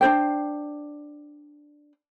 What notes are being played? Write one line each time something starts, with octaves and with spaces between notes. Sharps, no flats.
D4 F4 C5 G5